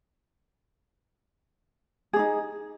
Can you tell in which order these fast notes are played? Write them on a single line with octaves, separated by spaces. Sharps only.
G#4 D4 D#4